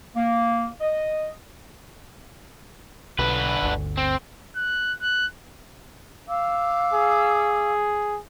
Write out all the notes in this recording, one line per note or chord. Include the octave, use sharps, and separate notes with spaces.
A#3
D#5
B1 D3 B4
G1 D2
C4
F#6
F#6
F5 D6 E6
G#4